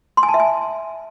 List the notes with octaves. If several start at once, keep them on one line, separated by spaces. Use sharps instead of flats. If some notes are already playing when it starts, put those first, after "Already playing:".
C6
G#5
A5
E5
G#5